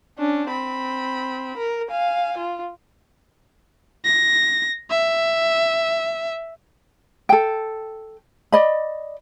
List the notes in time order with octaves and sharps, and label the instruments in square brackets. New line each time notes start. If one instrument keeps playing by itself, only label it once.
[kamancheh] C#4 D4
C4 B5
A#4
F5 G#5
F4
[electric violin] A#6
E5
[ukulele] A4 G5
D5 D#5 B5